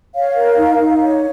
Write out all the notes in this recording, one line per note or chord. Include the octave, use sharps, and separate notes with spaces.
C#5 F5
A#4
D#4
D#4
C#5